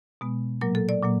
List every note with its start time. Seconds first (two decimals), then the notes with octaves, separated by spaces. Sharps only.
0.21 B2 G#3 B3
0.61 A#2 F#3 A#3 A#4
0.75 A4
0.89 D5
1.02 A#2 F#3 A#3